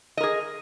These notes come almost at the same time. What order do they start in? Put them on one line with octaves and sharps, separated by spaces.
D#5 A#4 G#4